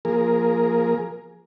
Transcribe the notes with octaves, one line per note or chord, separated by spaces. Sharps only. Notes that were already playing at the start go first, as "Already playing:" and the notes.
F3 A#3 G#4 A#4